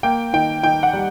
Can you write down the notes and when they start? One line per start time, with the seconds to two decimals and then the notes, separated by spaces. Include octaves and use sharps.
0.03 A#3 G5
0.33 D#3 G5
0.63 D#3 G5
0.83 F#5
0.93 G3